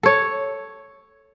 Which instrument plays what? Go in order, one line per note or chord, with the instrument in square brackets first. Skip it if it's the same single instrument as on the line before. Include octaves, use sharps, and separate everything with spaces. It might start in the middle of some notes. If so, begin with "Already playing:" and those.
[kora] A4 C#5